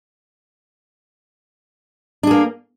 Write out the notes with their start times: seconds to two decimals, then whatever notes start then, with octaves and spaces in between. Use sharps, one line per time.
2.23 D4
2.27 G#4
2.31 A#3